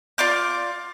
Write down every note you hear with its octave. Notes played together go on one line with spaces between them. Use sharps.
F4 D5 D6 G6